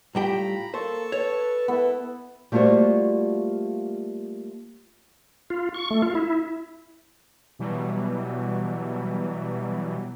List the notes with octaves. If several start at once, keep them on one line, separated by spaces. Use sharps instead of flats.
A2 G3 F4 G5 A#5 B5
A#3 A4 C5 A5 C#6
B4 C#5
B3 E4 A4
G3 A3 A#3 F4 F#4 C5
F4
C#6
A3
F4
E4
B2 E3 F#3 G3